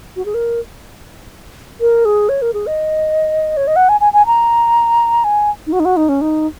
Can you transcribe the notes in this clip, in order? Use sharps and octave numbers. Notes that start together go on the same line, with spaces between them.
F#4
G#4
A#4
A#4
G#4
C#5
A#4
G#4
D#5
C#5
D#5
F#5
G#5
G#5
G#5
A#5
G#5
D#4
F#4
D#4
F#4
D#4
C#4
D#4